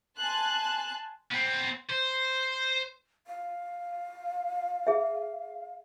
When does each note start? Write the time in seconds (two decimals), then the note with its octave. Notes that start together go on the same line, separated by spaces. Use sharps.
0.15 G#5 A5 C6 F#6
1.32 B3 C4
1.90 C5
3.27 F5
4.87 G#4 E5